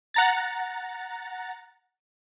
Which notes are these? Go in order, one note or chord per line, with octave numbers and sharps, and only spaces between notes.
F#5 A#5 A6